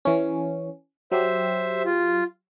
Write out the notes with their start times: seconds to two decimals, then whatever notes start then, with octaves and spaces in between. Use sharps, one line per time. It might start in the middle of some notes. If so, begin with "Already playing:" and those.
0.05 E3 C#4
1.12 F#3 G4 C5 E5
1.85 F4